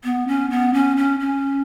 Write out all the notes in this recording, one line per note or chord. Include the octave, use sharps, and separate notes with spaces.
B3
C#4
B3
C#4
C#4
C#4